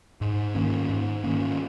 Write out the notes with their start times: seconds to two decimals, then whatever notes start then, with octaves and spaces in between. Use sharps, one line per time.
0.21 G#2
0.55 D#3 A#3 C#4
0.89 G#2
1.24 D#3 A#3 C#4